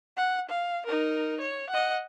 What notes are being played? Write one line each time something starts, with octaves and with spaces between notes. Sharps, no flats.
F#5
F5
D#4 A#4
C#5
D#5 F#5